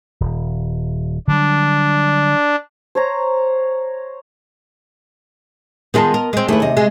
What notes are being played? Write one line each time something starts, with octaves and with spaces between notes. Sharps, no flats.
D#1
D3 F#3 G3 D4
C5 C#5 A#5
D#3 G#3 B3 F4 D#5 A5
A#4
G#3 C4
D#2 A3 E4 G#4 B4
C3 D#5
G#3